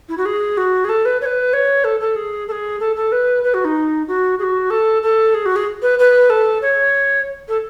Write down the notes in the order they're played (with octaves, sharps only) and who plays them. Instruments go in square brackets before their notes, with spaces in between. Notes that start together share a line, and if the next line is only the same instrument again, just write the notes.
[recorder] E4
F#4
G#4
F#4
G#4
A4
B4
C#5
B4
C#5
A4
A4
G#4
A4
G#4
A4
A4
B4
B4
F#4
D#4
F#4
G#4
F#4
A4
A4
G#4
F#4
G#4
B4
B4
A4
C#5
A4